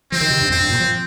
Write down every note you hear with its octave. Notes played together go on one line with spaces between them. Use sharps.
F3 C4
D#3
C3
G2
F2 C4
G2
A#2
F3